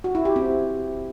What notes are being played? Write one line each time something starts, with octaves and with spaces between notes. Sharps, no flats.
F#4
E4
G4
C4